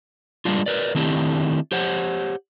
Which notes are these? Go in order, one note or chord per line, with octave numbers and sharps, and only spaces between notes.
G3 G#3 A#3 D4 F4
A#4 B4 D5
D#3 A3 C4 D4 E4 G4
G4 C5 C#5 F#5